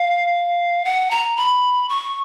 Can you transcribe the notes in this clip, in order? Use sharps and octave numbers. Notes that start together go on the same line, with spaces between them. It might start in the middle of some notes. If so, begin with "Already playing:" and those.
Already playing: F5
F#5
A#5
B5
C#6